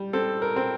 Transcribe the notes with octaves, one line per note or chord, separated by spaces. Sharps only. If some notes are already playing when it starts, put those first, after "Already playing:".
Already playing: G3
C4 A4
A#4
C4